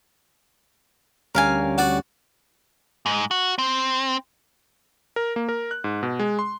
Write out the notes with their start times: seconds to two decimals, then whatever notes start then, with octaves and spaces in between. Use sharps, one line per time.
1.35 D2 G3 C#4 A#4 F5 G#5
1.78 F#4 D5
3.06 G#2
3.31 F#4
3.58 C4
5.16 A#4
5.36 A#3
5.49 A#4
5.71 F#6
5.84 G#2
6.03 B2
6.19 G#3
6.39 C6